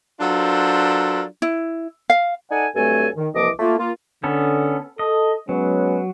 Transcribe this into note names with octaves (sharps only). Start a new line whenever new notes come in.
F#3 D4 F4 A4 A#4 C5
E4
F5
D#4 A4 D5 F#5 G#5
G2 F#3 A3 C4 A4 G#5
D#3
C2 E3 F3 A#3 D#5 D6
A3 A#3 F4
A#3 F4
D3 B3 C#4 A4
A4 D#5
F#3 G#3 B3 C#4